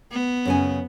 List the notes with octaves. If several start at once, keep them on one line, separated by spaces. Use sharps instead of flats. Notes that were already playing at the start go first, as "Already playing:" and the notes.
B3
F#2 C#3 G#5